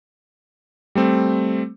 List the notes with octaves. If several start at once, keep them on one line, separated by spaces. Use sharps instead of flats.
G3 A3 C4